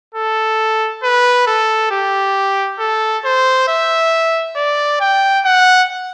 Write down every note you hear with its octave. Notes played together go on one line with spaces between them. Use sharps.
A4
B4
A4
G4
A4
C5
E5
D5
G5
F#5